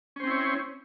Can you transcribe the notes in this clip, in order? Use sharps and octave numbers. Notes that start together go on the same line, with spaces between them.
C4 C#4 E4 C5 C#5